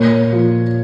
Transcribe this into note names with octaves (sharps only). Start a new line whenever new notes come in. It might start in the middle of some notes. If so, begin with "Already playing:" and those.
Already playing: A#2 A#4 C#5
F3